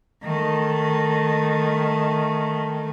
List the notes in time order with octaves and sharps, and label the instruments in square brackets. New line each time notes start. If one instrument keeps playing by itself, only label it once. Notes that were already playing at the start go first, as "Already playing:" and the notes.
[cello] D#3 A3